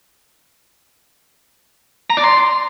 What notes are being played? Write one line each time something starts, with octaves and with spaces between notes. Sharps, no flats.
A#5
D5
C6